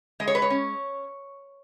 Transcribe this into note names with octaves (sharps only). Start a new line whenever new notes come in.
G#3 D#5
C#5
B4
C#5
C#4